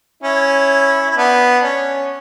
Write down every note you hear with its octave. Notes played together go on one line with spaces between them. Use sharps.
C#4 E4
E4
B3 D4
C#4